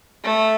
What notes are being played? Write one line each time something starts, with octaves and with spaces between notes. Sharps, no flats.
A3